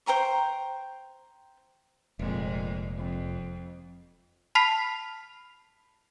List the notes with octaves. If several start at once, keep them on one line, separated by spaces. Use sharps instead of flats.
C5 G5 A#5 C#6
F1 F2 A#2 G#3
F2
A5 B5 F6 B6 C7 F7